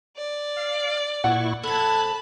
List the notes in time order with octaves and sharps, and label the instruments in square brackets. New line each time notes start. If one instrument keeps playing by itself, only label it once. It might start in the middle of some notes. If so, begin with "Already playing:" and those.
[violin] D5
[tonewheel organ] F5
[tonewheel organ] A#2 E4 C#6 [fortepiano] F#5
[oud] F2 A4 [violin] A5 B5 [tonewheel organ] F#6 G#6